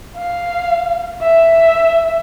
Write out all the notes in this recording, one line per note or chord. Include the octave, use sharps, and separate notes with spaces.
F5
E5